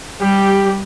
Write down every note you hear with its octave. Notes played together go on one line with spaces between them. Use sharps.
G3 G4